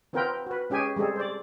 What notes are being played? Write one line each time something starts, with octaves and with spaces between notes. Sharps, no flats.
B3 C4 F4 A#4 B4 G5
F#4 B4
G#3 C#4 G4 G#4 G#5
G3 G#3 C4 G#4 A4
C5 D5